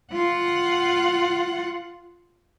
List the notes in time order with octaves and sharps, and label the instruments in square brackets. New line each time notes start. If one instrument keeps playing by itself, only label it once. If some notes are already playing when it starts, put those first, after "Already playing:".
[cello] F4 F#5